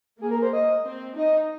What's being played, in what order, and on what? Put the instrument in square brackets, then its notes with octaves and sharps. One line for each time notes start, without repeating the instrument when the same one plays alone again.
[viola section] A#3 [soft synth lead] G#4
[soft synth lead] A#4
C5
D#5
[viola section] C4
[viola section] D#4 [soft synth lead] D#5